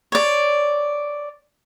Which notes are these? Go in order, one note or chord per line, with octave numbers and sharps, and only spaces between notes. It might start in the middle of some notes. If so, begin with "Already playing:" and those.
C#5 D5